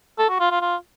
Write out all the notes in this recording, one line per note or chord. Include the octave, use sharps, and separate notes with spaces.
A4
F#4
F4
F4
F4